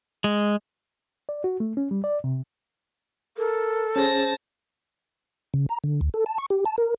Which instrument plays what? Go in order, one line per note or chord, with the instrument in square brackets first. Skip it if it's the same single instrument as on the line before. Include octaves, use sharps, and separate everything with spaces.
[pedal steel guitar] G#3
[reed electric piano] D5
F#4
A3
C#4
G3
D5
C3
[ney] A4 [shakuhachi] A#4
[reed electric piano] C#4 G#4 [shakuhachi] C5 [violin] A5 A#6
[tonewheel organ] C#3
A#5
D3
D2
A4
A5
C#6
G4
A5
A#4